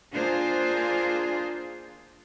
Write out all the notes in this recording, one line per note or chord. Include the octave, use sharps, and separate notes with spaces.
A#3 D4 F4 G#4 C5